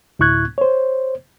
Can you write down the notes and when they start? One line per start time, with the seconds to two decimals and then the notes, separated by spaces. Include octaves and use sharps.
0.19 D2 A2 E4 C#6 F#6 G#6
0.58 C5 C#5